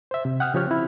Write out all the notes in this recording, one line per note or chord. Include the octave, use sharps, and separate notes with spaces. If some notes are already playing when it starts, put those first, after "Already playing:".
C5 E5
C3
F#5 G5 D#6 F6
C#3 F3 G4 C#5 F6
C4 E4